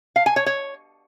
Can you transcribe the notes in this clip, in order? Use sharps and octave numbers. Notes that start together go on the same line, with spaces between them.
F5
G#5
C#5
C#5